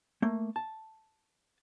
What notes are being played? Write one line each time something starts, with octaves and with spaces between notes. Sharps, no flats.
A3 A#3
A5